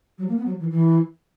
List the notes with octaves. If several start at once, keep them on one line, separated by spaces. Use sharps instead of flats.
F#3
A#3
B3
F#3
E3
E3